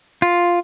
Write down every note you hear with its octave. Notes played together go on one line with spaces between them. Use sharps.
F4